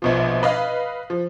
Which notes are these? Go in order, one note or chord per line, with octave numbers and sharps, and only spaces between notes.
A#1 B2 F3
B4 D#5 F5
F3